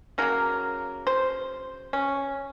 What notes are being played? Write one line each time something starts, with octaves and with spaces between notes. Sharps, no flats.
C#3 F#3 A#3 A#4
C5
C#4